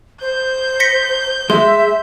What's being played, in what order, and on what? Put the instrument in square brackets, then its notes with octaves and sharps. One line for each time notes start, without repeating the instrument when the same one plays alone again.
[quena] C5 [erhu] G6
[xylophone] A#6 B6 C#7
[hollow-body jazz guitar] G#3 [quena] E5 [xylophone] C6